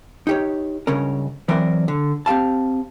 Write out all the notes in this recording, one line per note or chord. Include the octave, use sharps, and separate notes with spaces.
D#4 G4 C#5
C#2 G2 C#3 C#4 A#4
E3 F#3 C4 A#4 D5
D3
C4 G4 F5 A5